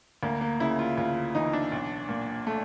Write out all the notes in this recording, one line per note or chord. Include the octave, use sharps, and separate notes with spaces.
D2 A#3
A#3
C#3 E4
F4
D2 F4
E3 D#4
D4
B1
A#2
A3